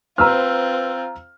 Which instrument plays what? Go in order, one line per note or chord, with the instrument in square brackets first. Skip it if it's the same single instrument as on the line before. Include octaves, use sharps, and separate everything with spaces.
[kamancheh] C4 F4 [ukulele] B4 C5 [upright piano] A#5 E6 F6